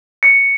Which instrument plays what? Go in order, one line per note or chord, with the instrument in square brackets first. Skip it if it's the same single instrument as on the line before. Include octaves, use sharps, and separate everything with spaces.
[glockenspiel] C#7